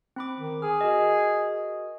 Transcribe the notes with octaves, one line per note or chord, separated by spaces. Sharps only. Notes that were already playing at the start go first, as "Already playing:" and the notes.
C4 B5 D6
D#3
G#4 F6
F#4 A#4 D#5